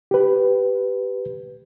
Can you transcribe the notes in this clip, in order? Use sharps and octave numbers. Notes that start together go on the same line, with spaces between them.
G4 B4